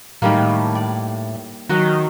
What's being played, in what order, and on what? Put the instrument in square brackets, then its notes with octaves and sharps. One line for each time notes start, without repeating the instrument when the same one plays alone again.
[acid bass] A2 [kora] D#3 G3 A#3
[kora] D5
[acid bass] D#3 [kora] F#3 F#4 D#5